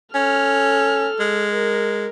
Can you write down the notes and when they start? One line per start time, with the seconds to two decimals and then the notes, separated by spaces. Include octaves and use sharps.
0.14 C#4 A4 F6
1.20 G#3
1.51 A#4